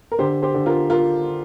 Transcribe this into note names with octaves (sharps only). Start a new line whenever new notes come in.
A#4
D3 G4 C5
G4 C5
D3
F4 A#4
F4 A#4